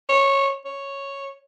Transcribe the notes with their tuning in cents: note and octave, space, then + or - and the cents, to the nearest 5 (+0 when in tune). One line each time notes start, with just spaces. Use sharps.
C#5 -10
C#5 -5